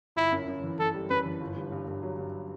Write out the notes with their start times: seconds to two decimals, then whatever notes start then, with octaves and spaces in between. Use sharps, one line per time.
0.16 G1 E4
0.32 F#2
0.48 F#2
0.63 E3
0.79 E3 A4
0.94 G3
1.10 F#2 B4
1.25 E3
1.41 G1
1.56 G2
1.72 G2
1.88 G2
2.03 F#3
2.18 G2